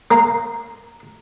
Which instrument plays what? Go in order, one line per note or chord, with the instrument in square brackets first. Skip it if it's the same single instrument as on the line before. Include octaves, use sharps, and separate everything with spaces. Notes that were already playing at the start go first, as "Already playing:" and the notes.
[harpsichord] A#3 A#5 C6